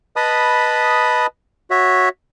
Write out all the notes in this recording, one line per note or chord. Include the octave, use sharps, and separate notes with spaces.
B4 D#5 A5 B5 D#6
F#4 C#5 E5